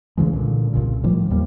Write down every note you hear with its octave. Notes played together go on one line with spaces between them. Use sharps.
C2 C#3 E3 G#3
A#2 D3
C2 A#2 C#3
A2 D#3 F3 G3
D#2 G3 A#3